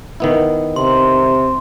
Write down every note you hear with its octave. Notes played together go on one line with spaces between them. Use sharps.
D#3 B3 E4
C3 C6